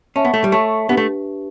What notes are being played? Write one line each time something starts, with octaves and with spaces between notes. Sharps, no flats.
C#4 C#5 E5 A5 C#6
B3
A3
G3
A3 C#5 E5 A5 C#6
B3 D4 G4 B4
A3